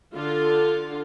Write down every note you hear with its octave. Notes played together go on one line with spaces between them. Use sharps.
D3 F4